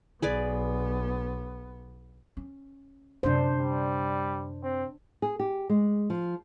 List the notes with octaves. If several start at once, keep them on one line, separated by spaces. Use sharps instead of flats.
B1 B3 G#4 B4 D5
C#4
F#2 C3 D4 C5
G3
C4
G#4
G4
G#3
F3